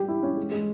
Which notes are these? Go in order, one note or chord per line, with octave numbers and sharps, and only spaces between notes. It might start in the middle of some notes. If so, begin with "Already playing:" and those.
Already playing: G3 G4
E4
C#4
G#3
G#3